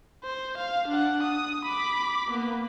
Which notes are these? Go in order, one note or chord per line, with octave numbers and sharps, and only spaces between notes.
C5
F5
D4 F#5
D#6
B5 D6
A#3 B3